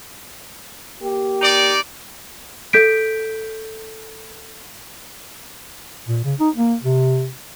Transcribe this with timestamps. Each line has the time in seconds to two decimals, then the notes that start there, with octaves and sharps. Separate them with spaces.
1.01 A#3 G4
1.41 D#4 D5
2.73 A4 G6 B6 D7
6.08 A#2
6.24 C#3
6.40 D#4
6.55 A#3
6.83 C3